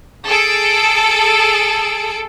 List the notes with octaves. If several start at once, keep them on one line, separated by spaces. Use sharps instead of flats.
G#4 A4 D7